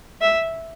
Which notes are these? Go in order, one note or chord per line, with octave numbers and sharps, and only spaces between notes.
E5